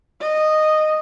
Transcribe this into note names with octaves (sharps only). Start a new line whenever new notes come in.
D#5